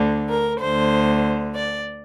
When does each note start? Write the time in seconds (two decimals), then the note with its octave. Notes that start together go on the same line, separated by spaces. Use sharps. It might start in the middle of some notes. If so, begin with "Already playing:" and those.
Already playing: D2 D3
0.28 A#4
0.59 D2 D3 C5
1.54 D5